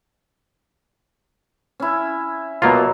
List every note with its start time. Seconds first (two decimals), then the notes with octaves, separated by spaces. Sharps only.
1.80 C#4 E4
2.62 B2 F#3 A#3 F4